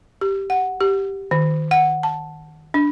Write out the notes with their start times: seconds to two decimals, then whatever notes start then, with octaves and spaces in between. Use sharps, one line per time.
0.21 G4
0.50 F#5
0.81 G4
1.31 D#3
1.71 F#5
2.03 A5
2.74 D4